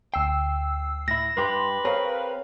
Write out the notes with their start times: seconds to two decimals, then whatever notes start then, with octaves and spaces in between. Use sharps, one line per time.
0.14 D2 G5 E6 C7
1.08 A2 E4 A#6
1.37 G2 G4 B4 C6
1.85 C4 G#4 A#4 C#5 F5